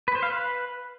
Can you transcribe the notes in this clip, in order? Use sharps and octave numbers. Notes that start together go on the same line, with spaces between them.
B4
C5
F5
B4